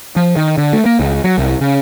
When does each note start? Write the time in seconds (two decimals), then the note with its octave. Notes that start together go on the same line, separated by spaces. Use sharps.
0.16 F3
0.36 D#3
0.58 D3
0.73 A3
0.86 A#3
1.00 C#2
1.24 F#3
1.38 C2
1.61 C#3